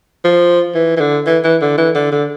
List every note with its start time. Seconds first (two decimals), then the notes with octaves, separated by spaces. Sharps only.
0.24 F3
0.75 E3
0.97 E3
1.00 D3
1.26 E3
1.44 E3
1.61 D3
1.78 E3
1.95 D3
2.12 D3